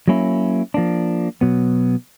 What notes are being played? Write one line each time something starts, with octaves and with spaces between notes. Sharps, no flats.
F#3 A#3 C#4 E4
F3 A#3 D4
B2 F#3 B3